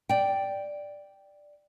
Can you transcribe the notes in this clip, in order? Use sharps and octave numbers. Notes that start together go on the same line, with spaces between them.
D5 G5